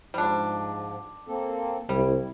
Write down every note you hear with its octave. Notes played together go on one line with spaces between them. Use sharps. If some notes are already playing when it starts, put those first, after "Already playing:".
G#2 F3 G3 D4
A#3 C4 A4
C2 G3 E4